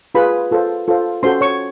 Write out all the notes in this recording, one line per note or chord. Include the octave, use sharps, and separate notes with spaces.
F4 G#4 B4 B5
F4 A4 C5
F4 A4 C5
C#4 F#4 A4 C5 C6
C#5 C#6